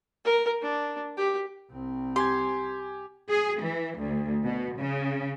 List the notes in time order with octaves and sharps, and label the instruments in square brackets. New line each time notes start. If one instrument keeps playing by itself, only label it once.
[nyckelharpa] A#4
D4
G4
[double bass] C2 C4
[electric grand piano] G4 G#5 G#6 [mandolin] C6
[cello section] G#4
E3
D2
B2
C#3